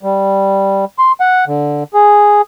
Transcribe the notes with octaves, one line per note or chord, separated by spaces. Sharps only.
G3
C6
F#5
D3
G#4